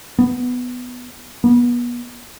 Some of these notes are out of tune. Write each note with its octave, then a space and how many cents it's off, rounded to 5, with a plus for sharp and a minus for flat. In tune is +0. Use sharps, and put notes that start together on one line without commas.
B3 +5
B3 -35